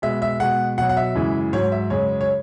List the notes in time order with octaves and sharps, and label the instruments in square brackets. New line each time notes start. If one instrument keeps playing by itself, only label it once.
[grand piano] B2 G#3 E5
E5
B2 G#3 F#5
B2 F#5
F#3
F#5
E5
F#2 C#3 E3 G#3
G#2 F#3 C#5
E5
F#2 C#3 G#3 C#5
C#5